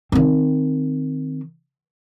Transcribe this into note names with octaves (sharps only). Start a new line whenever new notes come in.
D#3 C4